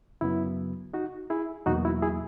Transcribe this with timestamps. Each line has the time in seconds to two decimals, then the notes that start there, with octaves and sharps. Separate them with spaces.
0.21 F#2 C#3 F#3 B3 E4
0.93 D#4 F#4
1.30 E4 G#4
1.66 E2 B2 F#3 A#3 D#4 F#4
1.85 E4
2.02 E4 G#4